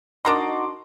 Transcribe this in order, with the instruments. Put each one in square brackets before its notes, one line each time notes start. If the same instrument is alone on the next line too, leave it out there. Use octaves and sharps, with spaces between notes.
[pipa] D4 A#4 D#5 [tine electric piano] D#4 F#4 [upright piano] C6 D6